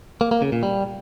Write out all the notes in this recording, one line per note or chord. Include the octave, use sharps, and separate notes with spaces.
A#3
A#3
C#3
A#2
G3